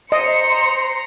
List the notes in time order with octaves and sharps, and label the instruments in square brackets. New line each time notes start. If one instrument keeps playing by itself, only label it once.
[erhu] C5 [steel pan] D#5 [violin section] A#5 C7 C#7